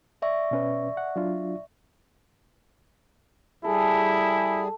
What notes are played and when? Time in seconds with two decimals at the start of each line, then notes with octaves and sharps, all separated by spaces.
0.22 D5 E5 C#6
0.51 B2 C#4 B4
0.97 F#5
1.16 F#3 D4 F4
3.64 G3 E4 G#4 A4